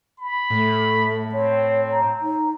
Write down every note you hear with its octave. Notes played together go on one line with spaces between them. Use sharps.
B5
A2 A3
C4 C#5
A#5
D#4